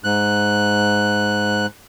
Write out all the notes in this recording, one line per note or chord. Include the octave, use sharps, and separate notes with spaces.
G#2 F#6